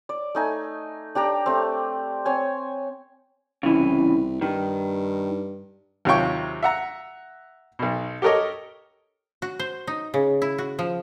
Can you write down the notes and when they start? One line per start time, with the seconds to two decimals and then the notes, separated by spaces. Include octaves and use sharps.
0.09 D5
0.35 A3 D#4 G#5
1.15 D4 G4 D5 A#5
1.46 A3 C4
2.26 C4 C#5 G#5
3.63 C2 C#3 E3
4.41 G2 D#3
6.05 D#2 C3 F#3 F4 G5 C#6
6.63 E5 F#5 A#5
7.79 B1 B2
8.22 G4 A4 A#4 C#5 D#5
9.42 F#4
9.59 C5
9.87 D#4
10.14 C#3
10.42 E4
10.58 F#4
10.79 F3